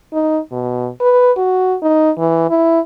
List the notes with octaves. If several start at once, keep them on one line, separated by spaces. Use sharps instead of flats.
D#4
B2
B4
F#4
D#4
E3
E4